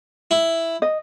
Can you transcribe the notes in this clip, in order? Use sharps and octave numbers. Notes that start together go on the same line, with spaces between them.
E4
D#5